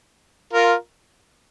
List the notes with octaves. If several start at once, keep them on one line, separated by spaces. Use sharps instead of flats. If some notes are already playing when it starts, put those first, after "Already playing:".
F4 A#4